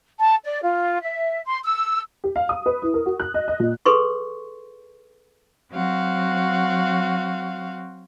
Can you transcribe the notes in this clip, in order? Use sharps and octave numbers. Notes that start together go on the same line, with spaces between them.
A5
D5
F4
E5
C6
E6
G4
F5
D#6
B4
E4
A#4
F#4
F#6
D#5
D#5
A#2
G#4 A4 B4 C6 C#6
F#3 C4 F#4 F5 F#5